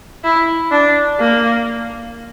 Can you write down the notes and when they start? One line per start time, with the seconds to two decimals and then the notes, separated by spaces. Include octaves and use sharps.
0.24 E4
0.71 D4
1.19 A#3